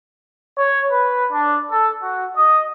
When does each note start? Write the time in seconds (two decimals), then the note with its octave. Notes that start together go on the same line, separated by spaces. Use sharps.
0.56 C#5
0.91 B4
1.32 D4
1.70 A4
2.02 F#4
2.36 D#5